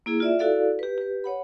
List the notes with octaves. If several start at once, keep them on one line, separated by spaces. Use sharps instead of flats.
A#3 E4 G#4
F4 D5 E5
E4 F#4 A4 D5 F5
G4 B4
G4 B4
C#5 F#5 B5